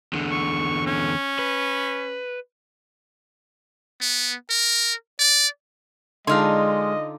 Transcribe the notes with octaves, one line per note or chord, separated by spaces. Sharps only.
E2 D3
C#6
C#4
B4
B3
A#4
D5
D3 G#3 D#4 F4 D#5 C6 F6